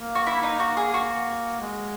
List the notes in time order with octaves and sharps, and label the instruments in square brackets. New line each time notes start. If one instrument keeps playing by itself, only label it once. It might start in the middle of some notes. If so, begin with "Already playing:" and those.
Already playing: [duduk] A#3
[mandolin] F#4
E4
D#4
F#4
G#4
F#4
[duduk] G#3